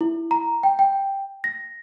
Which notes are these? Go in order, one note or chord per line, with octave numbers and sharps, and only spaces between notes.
E4
A#5
G5
G5
A#6